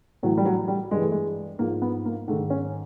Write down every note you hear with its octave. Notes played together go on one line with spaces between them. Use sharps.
A2 E3 F#3
G3
F#3
G3
G2 E3 G#3
A3
G#3
G#2 F3 A#3
B3
A#3
G#2 D#3 A3
C#4